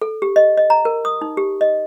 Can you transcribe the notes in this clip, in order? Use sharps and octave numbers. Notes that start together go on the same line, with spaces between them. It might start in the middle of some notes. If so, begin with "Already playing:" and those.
A4
G4
D#5
D#5
A#5
A#4
D#6
D#4
G4
D#5